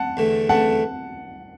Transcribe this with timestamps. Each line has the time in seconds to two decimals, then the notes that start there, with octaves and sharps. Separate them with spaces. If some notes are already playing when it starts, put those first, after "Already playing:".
Already playing: F#5 A5
0.17 E2 D3 A3
0.49 E2 D3 A3 F#5 A5